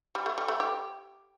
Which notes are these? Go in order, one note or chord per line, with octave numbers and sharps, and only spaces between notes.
G3
A3
G3
A3
G4